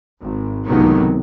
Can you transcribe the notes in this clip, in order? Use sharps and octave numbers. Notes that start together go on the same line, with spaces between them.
G#1
C#2 A2 C3 D#3 F#3 B3